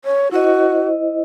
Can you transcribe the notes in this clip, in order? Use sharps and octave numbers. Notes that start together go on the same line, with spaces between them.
C#5
E4 F#4 C5 D#5